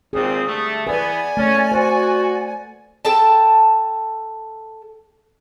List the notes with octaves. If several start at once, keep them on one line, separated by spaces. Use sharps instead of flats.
G#1 A#2 C4 G#4 D#6
D3 G3 A3
E3 B3 B4 D5 G#5
A3 C#4
F#4 C5
A4 G5 A5